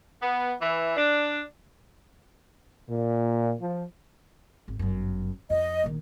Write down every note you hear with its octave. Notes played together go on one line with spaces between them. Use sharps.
B3
E3
D4
A#2
F3
G#1
G1 F#2
F2 D#5
A#1 D#3